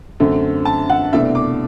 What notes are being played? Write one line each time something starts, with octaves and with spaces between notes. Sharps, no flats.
F#2 D3 A3 C4
A5
F#5
C2 B2 A3 D4 E5
D6